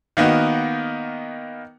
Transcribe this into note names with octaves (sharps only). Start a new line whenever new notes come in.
D#3 A#3 B3 D#4 F#4